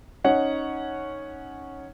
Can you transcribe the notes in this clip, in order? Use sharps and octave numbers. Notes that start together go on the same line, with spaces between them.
C#4 D#4 C#5 F#5